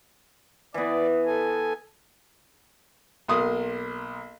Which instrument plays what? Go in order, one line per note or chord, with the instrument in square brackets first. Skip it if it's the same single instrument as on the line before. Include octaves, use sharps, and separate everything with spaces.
[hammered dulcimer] E3 B3 [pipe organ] D5
[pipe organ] A4 G#5
[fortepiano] B1 A#3 C6 D#6